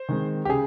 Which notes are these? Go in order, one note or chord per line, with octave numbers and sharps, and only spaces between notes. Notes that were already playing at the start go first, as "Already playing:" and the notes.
Already playing: C5
D#3 G#3 C4
G4
C#3 G#4